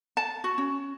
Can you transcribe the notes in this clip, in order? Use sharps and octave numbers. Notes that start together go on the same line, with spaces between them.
A5
F#4
C#4